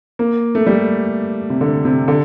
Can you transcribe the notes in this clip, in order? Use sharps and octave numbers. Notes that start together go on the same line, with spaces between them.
A#3
A3
G3
C3
D3
C3
D3